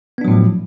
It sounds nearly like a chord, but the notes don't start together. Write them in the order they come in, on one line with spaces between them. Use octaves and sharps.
B3 D4 F#3 A2 F3